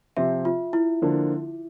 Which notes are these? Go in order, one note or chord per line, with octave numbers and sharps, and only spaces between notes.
C3 F3 C4 G4 C5 E5
F4
E4
D3 F3 A#3 D4